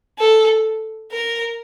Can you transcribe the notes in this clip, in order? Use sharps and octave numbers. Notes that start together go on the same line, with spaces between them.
A4
A#4